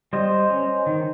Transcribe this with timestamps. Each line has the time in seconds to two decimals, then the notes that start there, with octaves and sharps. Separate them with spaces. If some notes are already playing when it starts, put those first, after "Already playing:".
0.13 G3 C5 D#5
0.50 C#4
0.86 D#3